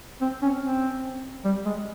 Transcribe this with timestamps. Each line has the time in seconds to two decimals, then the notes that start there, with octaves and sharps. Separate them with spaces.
0.22 C4
0.42 C#4
0.63 C4
1.45 G3
1.66 G#3